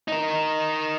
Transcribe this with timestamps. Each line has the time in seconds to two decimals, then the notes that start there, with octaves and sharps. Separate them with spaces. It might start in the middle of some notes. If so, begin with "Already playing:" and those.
0.08 D#4 A#4